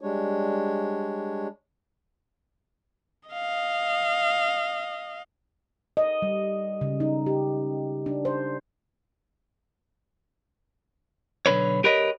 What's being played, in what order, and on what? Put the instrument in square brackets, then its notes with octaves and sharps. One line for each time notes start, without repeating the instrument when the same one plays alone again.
[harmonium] G3 G#3 D4 C#5
[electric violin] D#5 F5
[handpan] D#5
G3
C#3
D#4
G4
D4
C5
[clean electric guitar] B1 D3 B4 C#5
G4 A#4 B4 C#5 D#5